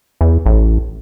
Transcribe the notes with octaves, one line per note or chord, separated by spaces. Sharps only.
E2
A1